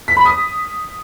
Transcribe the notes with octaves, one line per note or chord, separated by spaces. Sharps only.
B6
B5
D#6